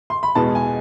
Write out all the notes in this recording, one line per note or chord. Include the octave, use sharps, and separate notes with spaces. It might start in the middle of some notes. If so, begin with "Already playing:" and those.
C6
B5
E2 B2 G#3 B3 A5
G#5